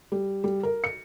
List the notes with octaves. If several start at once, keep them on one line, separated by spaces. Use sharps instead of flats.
G3
G3
A#4
C#7